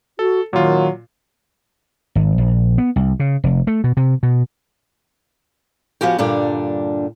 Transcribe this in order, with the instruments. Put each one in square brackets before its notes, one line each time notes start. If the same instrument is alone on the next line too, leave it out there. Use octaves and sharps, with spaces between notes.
[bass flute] F#4 [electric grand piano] A4
[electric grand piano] A#2 F4 [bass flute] D#3 [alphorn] F#3
[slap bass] G#1
A#1
B3
C2
C#3
F1
A3
B2
C3
B2
[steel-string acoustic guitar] F3 B3 C#4 F#4 G4
G2 A#2 D3 G3 D4